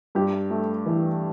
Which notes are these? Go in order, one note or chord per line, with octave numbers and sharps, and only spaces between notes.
G2 G4
A3
E3